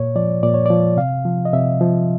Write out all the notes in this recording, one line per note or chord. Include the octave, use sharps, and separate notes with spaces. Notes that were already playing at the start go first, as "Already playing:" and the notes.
Already playing: A#2 C#5
F3 D5
A#2 D5
C#5
F3 D5
C3 F5
F3
D#5
C3 E5
F3